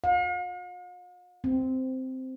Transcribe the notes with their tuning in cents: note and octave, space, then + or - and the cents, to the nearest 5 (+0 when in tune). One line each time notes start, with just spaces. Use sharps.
F5 +45
C4 -10